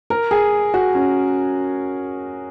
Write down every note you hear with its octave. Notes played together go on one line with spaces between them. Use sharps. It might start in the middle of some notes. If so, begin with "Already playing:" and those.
A#4
G#4
F#4
C#4